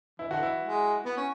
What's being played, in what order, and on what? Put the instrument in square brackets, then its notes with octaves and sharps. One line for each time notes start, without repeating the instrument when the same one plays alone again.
[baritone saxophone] E3 [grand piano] E4
[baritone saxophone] D3 [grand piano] F#4
[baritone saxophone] E3 [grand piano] E4
[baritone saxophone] G#3
B3
C#4